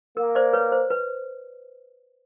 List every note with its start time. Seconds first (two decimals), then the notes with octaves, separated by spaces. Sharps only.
0.17 A#3 A#4
0.35 C5 D5
0.53 B4 C#5
0.72 C5
0.90 B4